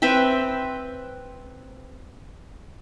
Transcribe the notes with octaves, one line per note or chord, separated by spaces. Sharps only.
C4 B4 E5 G5